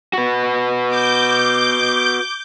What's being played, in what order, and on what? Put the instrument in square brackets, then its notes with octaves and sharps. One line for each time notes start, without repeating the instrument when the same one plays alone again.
[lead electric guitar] F#4 B4
[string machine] D6 G6